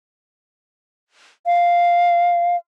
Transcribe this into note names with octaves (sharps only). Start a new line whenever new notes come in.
F5